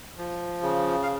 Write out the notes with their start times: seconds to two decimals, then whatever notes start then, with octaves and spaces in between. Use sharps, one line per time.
0.18 F3
0.63 C#3
1.03 F5